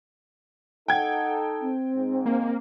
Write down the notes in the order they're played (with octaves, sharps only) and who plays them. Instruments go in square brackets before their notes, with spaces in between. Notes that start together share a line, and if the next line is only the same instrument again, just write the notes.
[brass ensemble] D#4 A4 [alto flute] F#5 [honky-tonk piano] G5 G#6
[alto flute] C4
[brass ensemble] G#2
[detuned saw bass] A#3